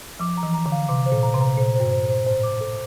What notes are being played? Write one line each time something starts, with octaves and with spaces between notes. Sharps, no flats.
F3 D6
A#5
E3
A#5
D3
F5
C3 D6
C5
A#2
A#5
C3
A#5
A#2 C5
G2 C5
C5
A#2
C5
A2 C5
D6
A4